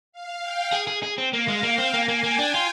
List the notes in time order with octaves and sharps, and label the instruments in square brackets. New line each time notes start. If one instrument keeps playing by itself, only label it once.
[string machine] F5
G5
[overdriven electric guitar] G#4
G#4
G#4
C4
[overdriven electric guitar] A#3 [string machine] F5
[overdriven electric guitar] G#3
[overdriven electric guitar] A#3 [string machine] G5
[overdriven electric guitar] C4
[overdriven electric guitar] A#3 [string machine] G#5
[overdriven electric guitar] A#3
[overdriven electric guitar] A#3 [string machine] G5
[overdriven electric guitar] D4
F4